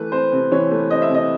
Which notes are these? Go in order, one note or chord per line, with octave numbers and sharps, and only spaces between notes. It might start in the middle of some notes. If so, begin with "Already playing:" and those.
Already playing: E3 A3 B4
C4 C5
C3
E3 C#5
A3
C4 D#5
E5
C3 D#5